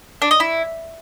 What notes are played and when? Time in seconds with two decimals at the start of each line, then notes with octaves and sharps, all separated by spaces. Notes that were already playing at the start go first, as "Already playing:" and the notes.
0.22 D4
0.31 D#5
0.40 E4